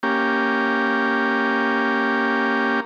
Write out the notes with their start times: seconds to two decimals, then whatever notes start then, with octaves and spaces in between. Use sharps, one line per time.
0.03 A#3 C#4 G4